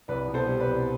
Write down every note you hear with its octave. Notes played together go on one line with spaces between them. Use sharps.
C2 B4 D5
B2
A4 C5
G3
B4 D5
C2